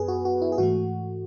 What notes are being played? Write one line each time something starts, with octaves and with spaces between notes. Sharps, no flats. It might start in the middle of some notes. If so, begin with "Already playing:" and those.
Already playing: F#2 B3 G#4 B4
F#4
F#4
E4
G#4
G#2 E3 A3 F#4